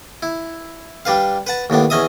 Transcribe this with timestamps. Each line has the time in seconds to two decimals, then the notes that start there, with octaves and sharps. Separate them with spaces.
0.22 E4
1.05 G3 D4 B4 F5
1.47 B4 F#5 A5
1.70 D#2 A2 B3 D4
1.90 E2 C#4 D#5 E5 D#6